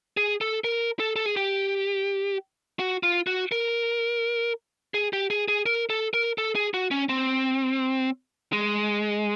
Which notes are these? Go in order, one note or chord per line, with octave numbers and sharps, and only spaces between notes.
G#4
A4
A#4
A4
A4
G#4
G4
F#4
F4
F#4
A#4
G#4
G4
G#4
G#4
A#4
A4
A#4
A4
G#4
F#4
C#4
C4
G#3